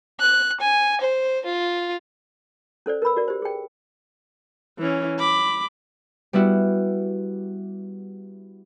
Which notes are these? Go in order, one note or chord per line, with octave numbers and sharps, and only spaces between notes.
F#6
G#5
C5
F4
C#4 A4 C5 D5
A#4 B4 B5 E6
F#4 A#4 D5
G4 C5
G#4 G5
E3 C#4
B5 D6
G3 B3 E4 F#4